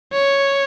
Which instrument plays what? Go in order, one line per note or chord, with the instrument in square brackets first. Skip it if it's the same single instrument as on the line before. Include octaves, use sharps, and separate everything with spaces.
[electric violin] C#5